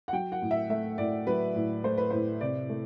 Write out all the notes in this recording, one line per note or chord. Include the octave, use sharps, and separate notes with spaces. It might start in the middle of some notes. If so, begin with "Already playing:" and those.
F#5
F#3 G5
F#5
A2
E5
A3 E5
A2 D5
F#3 B4
A2
A3 C5
B4
A2 C5
C3 D5
A3